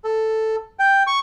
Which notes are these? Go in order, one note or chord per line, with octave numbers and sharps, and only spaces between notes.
A4
G5
C#6